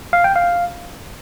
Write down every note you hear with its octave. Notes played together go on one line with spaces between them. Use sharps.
F5
G5
F5